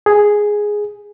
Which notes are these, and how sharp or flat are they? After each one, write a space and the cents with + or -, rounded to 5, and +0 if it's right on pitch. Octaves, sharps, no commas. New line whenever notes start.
G#4 +0